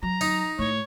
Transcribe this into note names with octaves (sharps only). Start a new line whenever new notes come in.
F#3 A#5
D#4
A2 A3 C#5